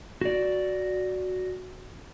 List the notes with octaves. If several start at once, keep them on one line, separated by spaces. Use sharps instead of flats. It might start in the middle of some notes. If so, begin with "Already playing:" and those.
F#4 D5